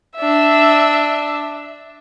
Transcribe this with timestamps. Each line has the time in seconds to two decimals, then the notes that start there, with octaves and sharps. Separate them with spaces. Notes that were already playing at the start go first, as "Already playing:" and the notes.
0.16 D4 E5